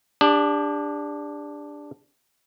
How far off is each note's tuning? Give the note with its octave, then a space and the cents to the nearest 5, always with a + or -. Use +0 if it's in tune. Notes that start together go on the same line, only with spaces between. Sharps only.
D4 +0 G4 +40